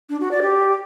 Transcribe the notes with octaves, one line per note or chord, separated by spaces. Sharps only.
D4
F#4
D5
G4